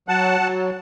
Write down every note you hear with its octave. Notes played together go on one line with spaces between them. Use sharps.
F#3 F#5 A5
F#3